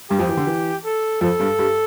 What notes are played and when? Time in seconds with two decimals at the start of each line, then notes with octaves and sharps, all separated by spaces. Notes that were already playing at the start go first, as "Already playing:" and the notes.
0.10 G2 G3 G4
0.19 F2 F3
0.29 E3
0.37 D3
0.47 E3
0.85 A4
1.21 F2 F3 A4
1.40 G2 G3
1.59 G2 G3